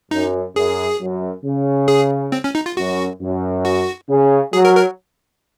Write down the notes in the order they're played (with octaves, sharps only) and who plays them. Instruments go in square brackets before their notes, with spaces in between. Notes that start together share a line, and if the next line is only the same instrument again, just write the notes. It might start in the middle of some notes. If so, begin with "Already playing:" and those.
[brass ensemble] F#2 [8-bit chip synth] D#4
[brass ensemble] F#2 [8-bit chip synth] G#4
[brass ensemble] F#2
C#3
[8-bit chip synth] G#4
C4
C#4
D#4
F4
[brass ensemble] F#2 [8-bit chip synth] F#4
[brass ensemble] F#2
[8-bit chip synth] F#4
[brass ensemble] C#3
[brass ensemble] F#3 [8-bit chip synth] G#4
[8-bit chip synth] A#4
A#4